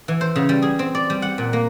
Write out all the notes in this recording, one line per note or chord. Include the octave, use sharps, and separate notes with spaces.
E3
C5
C#3
G3
G#4
C4
D5
G3
F#5
A#2
A#3